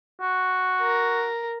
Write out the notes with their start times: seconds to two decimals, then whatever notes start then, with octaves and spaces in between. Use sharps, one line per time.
0.22 F#4
0.81 A#4